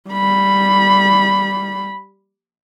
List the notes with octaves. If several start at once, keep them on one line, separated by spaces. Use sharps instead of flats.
G3 B5